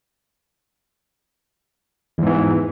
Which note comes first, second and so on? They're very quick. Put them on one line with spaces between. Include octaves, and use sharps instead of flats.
E2 G#2 E3